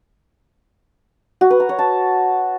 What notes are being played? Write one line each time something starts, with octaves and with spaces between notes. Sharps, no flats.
F#4
B4
A#5
C#5
A5